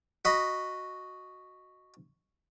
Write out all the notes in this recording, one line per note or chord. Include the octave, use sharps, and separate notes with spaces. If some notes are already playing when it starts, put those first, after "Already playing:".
F#4 D#5 B5